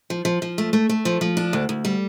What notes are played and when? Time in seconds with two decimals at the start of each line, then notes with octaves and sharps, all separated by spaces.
0.10 F3
0.25 F3
0.42 F3
0.58 A3
0.73 A3
0.89 A3
1.05 F3
1.21 F3
1.37 D4
1.53 D2
1.69 D2
1.85 G3